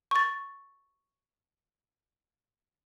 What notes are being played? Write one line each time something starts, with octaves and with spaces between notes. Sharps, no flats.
C#6 A6